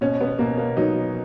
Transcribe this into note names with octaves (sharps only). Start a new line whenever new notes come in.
B2 C#4
B3
B2 A#3
A#3
F#3 D#4